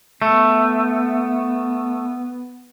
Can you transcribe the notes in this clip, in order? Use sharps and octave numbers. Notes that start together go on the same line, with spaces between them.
A3 B3